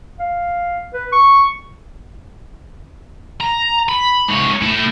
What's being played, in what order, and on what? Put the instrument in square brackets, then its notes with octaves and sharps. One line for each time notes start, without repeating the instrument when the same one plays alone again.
[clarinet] F5
B4
C#6
[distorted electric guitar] A#5
B5
G#2 C#5
A3 E4